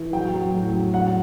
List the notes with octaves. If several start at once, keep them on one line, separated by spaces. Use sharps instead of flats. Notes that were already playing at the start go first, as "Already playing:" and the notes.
Already playing: E3
F#3 G5
F#3
A2
F#3
F#3 F#5